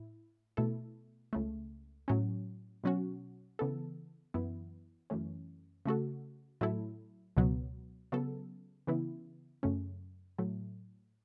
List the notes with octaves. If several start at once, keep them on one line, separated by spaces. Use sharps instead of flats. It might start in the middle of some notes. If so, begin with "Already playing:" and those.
Already playing: A2 E4
B2 A3 E4 A4
C#2 C#3 A3
A2 F#3 C#4
B2 F#3 C#4 F#4
C#3 E3 B3 A4
F#2 E3 B3 E4
F#2 E3 A3 C#4
C#3 A3 F#4 A4
A2 F#3 A3 E4 A4
C#2 B2 F#3 B3
C#3 F#3 B3 A4
C#3 E3 B3 E4
F#2 C#3 A3 C#4
A2 F#3 A3